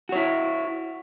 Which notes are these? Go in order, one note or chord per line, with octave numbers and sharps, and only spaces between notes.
E4 F#4 C#5